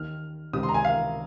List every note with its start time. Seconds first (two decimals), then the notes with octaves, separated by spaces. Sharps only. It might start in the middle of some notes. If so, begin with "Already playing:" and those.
Already playing: D#2 D#3 F6
0.53 C#2 C3 D#3 D#6
0.63 C6
0.69 A#5
0.74 G#5
0.85 F5